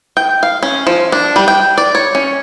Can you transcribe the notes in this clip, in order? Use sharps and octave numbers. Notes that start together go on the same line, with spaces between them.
G5
F5
C#4
F3
D4
G3
G5
D5
C#5
C#4